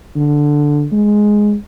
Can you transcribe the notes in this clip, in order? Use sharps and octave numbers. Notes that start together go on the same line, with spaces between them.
D3
G#3